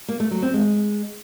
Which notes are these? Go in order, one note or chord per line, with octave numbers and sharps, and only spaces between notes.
A#3
A3
F#3
C4
G#3